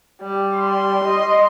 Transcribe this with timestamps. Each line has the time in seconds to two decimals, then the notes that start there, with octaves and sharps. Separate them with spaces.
0.22 G3
0.53 C6
1.04 D#5